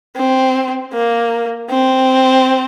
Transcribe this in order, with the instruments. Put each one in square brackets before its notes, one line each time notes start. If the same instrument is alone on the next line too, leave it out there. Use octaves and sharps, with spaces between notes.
[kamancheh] C4
A#3
C4